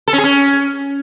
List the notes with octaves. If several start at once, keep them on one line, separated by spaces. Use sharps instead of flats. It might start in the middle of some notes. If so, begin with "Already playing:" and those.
A4
C#4
G#4
C#4